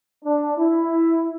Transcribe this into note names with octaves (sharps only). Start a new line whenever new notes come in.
D4
E4